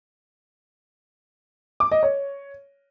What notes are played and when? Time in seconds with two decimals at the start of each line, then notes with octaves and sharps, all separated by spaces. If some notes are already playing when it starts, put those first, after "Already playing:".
1.80 D6
1.91 D#5
2.03 C#5